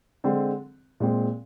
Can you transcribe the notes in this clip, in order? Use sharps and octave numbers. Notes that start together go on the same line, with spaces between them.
D3 G#3 C4
A#2 G#3 C4